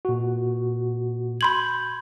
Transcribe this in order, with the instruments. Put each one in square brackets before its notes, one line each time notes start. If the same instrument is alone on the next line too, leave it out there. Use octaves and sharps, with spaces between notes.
[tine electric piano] A#2 F#4
[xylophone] B5 C6 F#7 [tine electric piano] G6 G#6